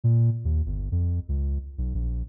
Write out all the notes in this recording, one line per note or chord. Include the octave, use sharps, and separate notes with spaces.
A#2
D#2
G1
F2
C#2
B1
A#1